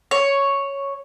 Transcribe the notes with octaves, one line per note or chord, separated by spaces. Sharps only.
C#5